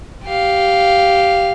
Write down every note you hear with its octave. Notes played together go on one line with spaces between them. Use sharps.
G4 F5